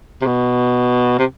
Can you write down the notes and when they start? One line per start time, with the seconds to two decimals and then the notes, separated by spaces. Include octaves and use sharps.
0.21 C3
0.26 B2
1.19 C3